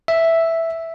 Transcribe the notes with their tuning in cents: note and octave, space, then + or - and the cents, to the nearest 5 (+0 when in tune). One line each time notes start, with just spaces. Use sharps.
E5 +0